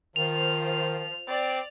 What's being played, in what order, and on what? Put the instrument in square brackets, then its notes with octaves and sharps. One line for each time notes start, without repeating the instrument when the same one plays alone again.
[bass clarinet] D#3 [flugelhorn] F3 [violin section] F4 C5 [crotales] F7
[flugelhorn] C4 [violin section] D5